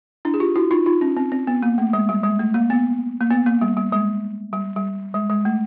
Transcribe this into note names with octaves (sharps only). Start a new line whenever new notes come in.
D4 E4
G#4
F4 G4
E4 F#4
D#4 F4
D#4 F4
C#4
C4
C4
B3
A#3
A3
G#3
G3
G#3
A3
A#3
B3
A#3
B3
A#3
G3
G3
G#3
G3
G3
G#3
G#3
A3